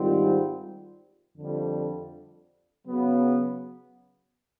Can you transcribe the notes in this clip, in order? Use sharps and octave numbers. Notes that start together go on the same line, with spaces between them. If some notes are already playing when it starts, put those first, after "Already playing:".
Already playing: G#2 D#3 G3 C4 F4
F2 D3 G3
C#3 F#3 B3